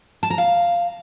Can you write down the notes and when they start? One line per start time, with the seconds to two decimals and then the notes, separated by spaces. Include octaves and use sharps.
0.23 A5
0.30 A#5
0.38 F5